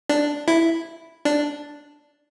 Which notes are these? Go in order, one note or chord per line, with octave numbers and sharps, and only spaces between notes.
D4
E4
D4